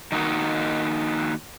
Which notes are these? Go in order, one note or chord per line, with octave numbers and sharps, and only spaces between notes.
D#3 A#3 D#4 F#4